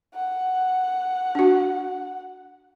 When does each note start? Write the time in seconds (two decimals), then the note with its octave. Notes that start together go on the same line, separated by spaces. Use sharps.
0.14 F#5
1.35 D4 F#4